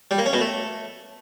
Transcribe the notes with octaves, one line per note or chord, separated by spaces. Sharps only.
G3
A#3
C#4
B2
A3